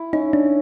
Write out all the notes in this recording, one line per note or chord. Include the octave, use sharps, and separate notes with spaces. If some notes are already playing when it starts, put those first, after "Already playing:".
Already playing: E4
C#4 D#4
D4